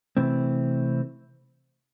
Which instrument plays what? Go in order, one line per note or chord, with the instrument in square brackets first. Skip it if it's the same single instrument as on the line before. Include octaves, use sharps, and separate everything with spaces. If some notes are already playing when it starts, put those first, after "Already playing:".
[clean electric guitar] C3 E3 A3 C4